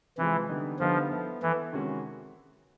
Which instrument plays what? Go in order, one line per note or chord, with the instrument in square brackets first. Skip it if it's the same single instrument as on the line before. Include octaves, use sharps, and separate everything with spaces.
[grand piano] C3 F3 G#3 [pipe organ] E3
[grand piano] D3 G3 B3 D#4
[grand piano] D3 G3 B3 D#4 [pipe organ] F3
[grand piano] B3 E4 A4
[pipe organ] E3 [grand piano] B3 E4 A4
[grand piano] C3 D#3 G#3 C#4 F#4